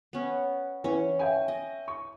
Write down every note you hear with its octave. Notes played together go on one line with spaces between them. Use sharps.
B3 C#4
E3 C#4
E5 G5 G#5
D#5
C#6